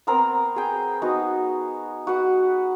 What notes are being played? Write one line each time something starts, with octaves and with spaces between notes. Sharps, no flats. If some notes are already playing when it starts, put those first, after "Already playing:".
B3 C4 A#4 A#5
G#4 G5
B3 D#4 F#4
F#4 B4 F#5